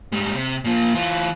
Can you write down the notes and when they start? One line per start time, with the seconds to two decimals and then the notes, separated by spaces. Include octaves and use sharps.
0.12 G#2 G3
0.35 C3
0.64 A#2 F3
0.95 E3 F4